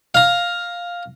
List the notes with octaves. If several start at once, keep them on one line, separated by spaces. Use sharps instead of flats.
F5 A#5